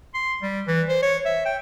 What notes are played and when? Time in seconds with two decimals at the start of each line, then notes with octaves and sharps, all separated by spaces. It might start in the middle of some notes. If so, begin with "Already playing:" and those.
0.14 C6
0.42 G3
0.67 E3
0.89 C5
1.03 C#5
1.25 E5
1.46 G5